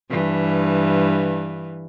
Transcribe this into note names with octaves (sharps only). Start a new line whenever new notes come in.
G2 E3